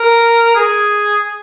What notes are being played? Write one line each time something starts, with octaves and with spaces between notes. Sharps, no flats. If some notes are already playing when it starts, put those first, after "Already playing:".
Already playing: A#4
G#4